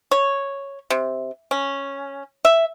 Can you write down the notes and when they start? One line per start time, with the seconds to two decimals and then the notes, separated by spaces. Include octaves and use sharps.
0.11 C#5
0.90 C3
1.51 C#4
2.45 E5